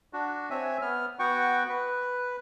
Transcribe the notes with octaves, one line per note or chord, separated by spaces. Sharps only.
D4 F#4
C4 C#5 E5 G#5
B3 F6
B3 F#4 F#5 G5 C#6
B4